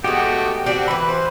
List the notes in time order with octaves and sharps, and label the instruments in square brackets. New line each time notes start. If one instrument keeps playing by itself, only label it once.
[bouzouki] G#3 B3 [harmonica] A3 F#4 G5 [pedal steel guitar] G4
[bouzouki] C4 D4 G4 [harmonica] F#4
[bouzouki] E3 B4 [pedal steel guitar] B5
[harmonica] C5